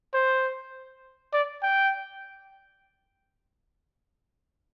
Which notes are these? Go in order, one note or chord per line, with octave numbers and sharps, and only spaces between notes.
C5
D5
G5